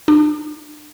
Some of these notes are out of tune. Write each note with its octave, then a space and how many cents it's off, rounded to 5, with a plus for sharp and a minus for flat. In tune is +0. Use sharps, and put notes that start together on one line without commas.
D4 +40